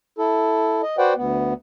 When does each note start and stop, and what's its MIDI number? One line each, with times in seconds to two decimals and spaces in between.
0.18 0.82 64
0.18 0.82 69
0.83 0.96 75
0.98 1.13 66
0.98 1.13 71
0.98 1.13 72
0.98 1.13 74
0.98 1.13 78
0.98 1.13 79
1.16 1.53 38
1.16 1.53 59